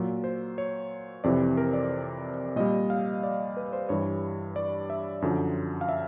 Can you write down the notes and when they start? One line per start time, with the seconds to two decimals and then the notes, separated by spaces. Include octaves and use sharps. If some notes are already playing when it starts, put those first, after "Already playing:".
Already playing: A#2 F#3
0.24 C5
0.58 C#5
1.24 F2 C3 E3 D5
1.57 A#4
1.73 D5
2.56 A#2 G3 D#5
2.90 F5
3.23 D5
3.57 B4
3.73 C5
3.89 G2 E3 G3 C#5
4.56 D5
4.90 E5
5.22 F#2 D3 F3
5.81 F5
5.89 E5